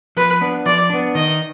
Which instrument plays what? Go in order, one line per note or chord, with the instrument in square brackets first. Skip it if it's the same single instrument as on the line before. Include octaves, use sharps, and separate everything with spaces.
[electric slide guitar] F3 [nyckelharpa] B4
[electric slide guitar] B3 D4
[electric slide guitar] F3 [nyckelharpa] D5
[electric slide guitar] B3 D4
[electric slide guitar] D#3 [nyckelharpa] D#5